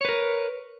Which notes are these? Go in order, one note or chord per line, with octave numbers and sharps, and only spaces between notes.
A#4 B4 C#5